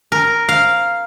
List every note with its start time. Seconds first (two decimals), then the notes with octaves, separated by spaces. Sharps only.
0.12 A#4
0.49 F5